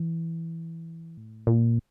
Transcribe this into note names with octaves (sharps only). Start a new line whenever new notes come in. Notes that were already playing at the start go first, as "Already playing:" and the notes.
Already playing: E3
A2
A#2